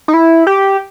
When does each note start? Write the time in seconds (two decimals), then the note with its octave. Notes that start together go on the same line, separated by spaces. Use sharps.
0.08 D#4
0.14 E4
0.47 G4